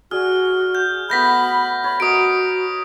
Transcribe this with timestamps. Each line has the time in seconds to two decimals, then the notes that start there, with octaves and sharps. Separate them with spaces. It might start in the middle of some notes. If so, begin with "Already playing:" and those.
0.11 F#4 G#4 D5 G#5 F6
0.75 G6
1.10 A3 B3 F#4 B5 G6 A#6 B6
1.84 C#5 B5
2.00 F#4 A#4 B4 D#5 D#6 D7